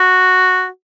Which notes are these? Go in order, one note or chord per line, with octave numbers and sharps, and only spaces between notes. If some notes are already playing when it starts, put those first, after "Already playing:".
Already playing: F#4